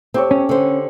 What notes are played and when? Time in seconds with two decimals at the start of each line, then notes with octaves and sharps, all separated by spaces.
0.14 A3 C4 G4 C#5
0.31 C#4
0.49 D3 C5